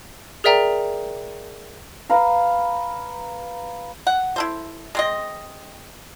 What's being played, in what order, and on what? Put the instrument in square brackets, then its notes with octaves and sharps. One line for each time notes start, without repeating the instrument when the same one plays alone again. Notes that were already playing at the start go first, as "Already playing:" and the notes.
[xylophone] G#4 A#4 D5 E5 G5 A#5
[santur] B4 F5 A#5
[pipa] F#5
E4 A4 C5
G#3 C4 D#5